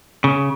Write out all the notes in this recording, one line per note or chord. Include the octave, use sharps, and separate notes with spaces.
C#3